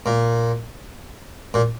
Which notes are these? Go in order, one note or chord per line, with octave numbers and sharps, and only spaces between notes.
A#2
A#2